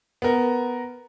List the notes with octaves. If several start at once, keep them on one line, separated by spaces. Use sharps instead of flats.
B3 A#4